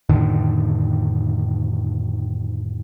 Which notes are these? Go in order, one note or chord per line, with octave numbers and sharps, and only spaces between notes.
F2 A2 D3 D#3